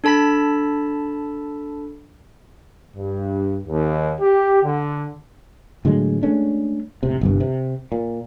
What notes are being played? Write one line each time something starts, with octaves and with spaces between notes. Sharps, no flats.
D4 A4 A5 B5 B6
G2
D#2
G4
D3
A2 D3 F#3 G#3
G#3 A3 C#4 D4
E1 A1 C3
G1 C2 G2
C3
A#2